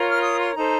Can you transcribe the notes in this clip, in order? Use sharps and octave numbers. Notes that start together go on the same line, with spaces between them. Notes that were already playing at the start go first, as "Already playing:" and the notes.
Already playing: F4 A#4 C#5
F6
D#6
C6
D#4 A4 C5 A#5